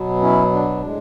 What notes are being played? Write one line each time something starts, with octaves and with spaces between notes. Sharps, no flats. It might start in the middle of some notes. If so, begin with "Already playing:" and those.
Already playing: B2 F#3 B3
C#4 E4
D4
A2 G#3